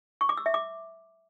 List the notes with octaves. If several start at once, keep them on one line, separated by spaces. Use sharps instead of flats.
C#6
D6
E6
E5
D6